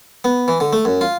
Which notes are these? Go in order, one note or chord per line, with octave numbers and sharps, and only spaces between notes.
B3
E3
D3
A3
F#2
F4